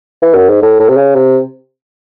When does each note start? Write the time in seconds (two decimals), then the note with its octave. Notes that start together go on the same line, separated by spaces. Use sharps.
0.22 E3
0.35 F#2
0.49 G#2
0.62 A2
0.80 A2
0.89 C3
0.97 C#3
1.15 C3